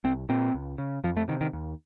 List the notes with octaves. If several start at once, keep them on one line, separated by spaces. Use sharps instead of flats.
C2 C4
A#2 C4
C#2
C#3
F2 F3
A3
C3 D#3
D#3
D#2